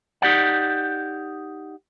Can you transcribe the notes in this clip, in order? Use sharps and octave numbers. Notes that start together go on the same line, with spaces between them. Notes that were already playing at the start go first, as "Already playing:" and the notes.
D#4 G4 D5 F#5